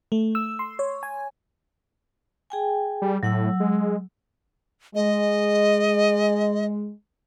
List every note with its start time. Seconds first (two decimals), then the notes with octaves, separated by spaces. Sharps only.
0.12 A3
0.35 E6
0.59 C6
0.79 C#5
1.03 G#5
2.50 G#4 G5 G#5
3.02 G3
3.23 A2 F#3 F#5 E6
3.60 G#3
4.95 G#3 D#5